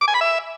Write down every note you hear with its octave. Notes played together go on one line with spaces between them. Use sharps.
D6
G#5
B5
E5